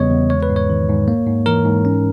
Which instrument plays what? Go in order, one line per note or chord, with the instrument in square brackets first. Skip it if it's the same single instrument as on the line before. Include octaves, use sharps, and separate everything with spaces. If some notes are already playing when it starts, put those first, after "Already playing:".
Already playing: [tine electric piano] E2 C#3 G3 B3 C#5 D#5
E2
G#3 C#5
B4
G#2
C#5
D#3
G#2
A#3
G#2
E3 A#4
G#2
C#4